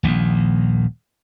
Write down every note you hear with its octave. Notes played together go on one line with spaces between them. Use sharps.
D#1 A#1 D#2